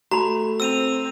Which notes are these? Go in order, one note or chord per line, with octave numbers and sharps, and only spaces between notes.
A3 F#4 A#5 B5
C4 E6 D#7 F7